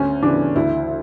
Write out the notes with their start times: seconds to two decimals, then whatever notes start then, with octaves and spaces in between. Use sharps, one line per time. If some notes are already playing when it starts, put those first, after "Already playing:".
Already playing: D2 C#4
0.22 C#3 E3 D4
0.55 D2 E4